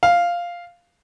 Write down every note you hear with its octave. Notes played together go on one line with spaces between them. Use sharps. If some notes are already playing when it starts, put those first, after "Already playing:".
F5